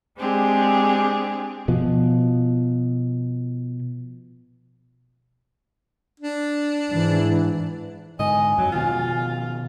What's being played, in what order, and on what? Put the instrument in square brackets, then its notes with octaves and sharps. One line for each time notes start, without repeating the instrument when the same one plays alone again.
[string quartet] G#3 C4 D4 G4 G#4
[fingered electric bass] B2 F3
[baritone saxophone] D4
[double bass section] G#2 E3
[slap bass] G#2 D3 [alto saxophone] D#5 [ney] G#5
[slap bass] F2 [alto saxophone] F#3
[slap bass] B2 D#3 F3 [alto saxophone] F4